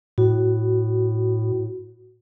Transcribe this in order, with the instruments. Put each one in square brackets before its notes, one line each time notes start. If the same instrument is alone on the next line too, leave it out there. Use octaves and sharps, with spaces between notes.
[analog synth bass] A2 [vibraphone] F#4